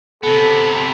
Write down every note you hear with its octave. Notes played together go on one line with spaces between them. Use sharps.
C3 B3 A4